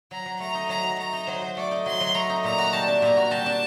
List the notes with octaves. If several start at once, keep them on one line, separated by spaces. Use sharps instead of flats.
F#3 A#5
F#3
A3 A#5
D#4
F#3 A#5
F#3
A3 A#5
D#4
F#3 C5
F#3
A3 D5
D#4
F#3 C6
F#3
A3 A#5
D#4
A#2 A#5
F#4
G3 A5
D4
A#2 A#5
F#4
G3 A5
D4